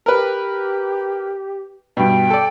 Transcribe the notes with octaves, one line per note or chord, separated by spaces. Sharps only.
G4 A#4 B4
G2 B2 G5
A4 D5